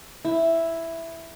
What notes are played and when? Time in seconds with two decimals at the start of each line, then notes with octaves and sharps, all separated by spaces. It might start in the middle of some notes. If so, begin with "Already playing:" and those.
0.25 E4